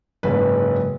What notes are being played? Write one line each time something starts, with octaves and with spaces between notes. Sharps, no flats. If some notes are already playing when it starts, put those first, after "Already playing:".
F#1 G#2 B4